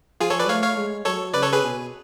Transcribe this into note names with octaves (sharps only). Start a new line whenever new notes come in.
F3 F4 G#4
A4 C#5
B4 D5
A3 C#5 F5
C#5 F5
G#3
F#3 A4 C#5
C#3 B4 D5
A4 C#5
G#4 B4
B2